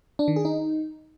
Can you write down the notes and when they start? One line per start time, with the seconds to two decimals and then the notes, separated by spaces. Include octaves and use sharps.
0.19 D4
0.28 D#3
0.36 G#4
0.45 D#4